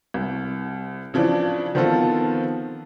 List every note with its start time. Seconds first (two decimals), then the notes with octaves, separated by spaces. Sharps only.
0.14 C2
1.14 C#3 E3 F3 D4
1.75 D#3 F3 B3 C4 F4 A4